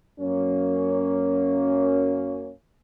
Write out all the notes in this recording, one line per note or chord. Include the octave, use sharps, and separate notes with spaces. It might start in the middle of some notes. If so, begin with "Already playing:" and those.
F#2 A#3 C#4